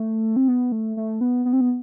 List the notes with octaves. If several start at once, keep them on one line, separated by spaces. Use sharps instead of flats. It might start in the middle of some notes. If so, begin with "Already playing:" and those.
Already playing: A3
C4
B3
A3
A3
B3
B3
C4
B3